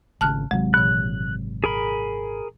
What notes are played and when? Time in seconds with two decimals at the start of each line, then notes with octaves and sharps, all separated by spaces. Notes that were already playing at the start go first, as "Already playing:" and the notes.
0.21 G#1 C#3 A5 F6 F#6
0.51 G#1 C3 F#3 G#3
0.74 A#2 E3 F#6
1.64 G#4 A#4 B5